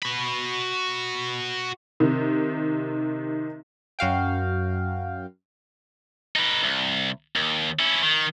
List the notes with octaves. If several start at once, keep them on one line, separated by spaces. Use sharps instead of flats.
F#4 B5
C3 D#3
F#2 F#4 F5 G5
D#4 B4
C2
D#2
C#4 E4
D#3